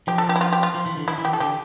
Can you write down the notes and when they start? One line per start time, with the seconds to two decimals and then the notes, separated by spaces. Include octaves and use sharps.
0.07 F3 G4
0.18 A4
0.29 G4
0.36 E4
0.41 F4
0.53 G4
0.63 F4
0.74 F3
0.86 E3
0.97 D3
1.08 E3 E4
1.18 E3
1.25 G4
1.33 A4
1.40 D3 G4